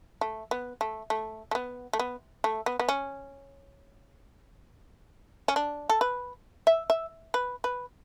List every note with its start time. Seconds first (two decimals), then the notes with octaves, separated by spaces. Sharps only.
0.21 A3
0.51 B3
0.81 A3
1.10 A3
1.51 A3
1.55 B3
1.93 A3
1.99 B3
2.44 A3
2.66 B3
2.80 B3
2.89 C#4
5.48 C#4
5.56 D4
5.90 A4
6.01 B4
6.67 E5
6.90 E5
7.34 B4
7.64 B4